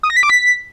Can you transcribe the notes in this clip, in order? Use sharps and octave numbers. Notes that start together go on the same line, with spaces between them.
D#6
A#6
B6
D6
B6